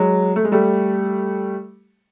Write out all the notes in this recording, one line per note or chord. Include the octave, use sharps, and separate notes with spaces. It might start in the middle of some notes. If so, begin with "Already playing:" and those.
Already playing: F#3 G#3
A3
G#3
G3 A3